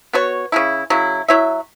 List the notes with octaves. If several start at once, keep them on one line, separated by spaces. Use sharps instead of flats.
B3 F#4 C#5
C#3 F#3 E4
C#3 F#3 E4
F#3 E4 C#5 E5